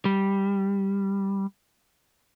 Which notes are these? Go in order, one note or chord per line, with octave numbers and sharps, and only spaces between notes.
G3